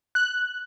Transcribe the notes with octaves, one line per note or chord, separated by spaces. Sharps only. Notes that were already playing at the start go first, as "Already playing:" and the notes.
F#6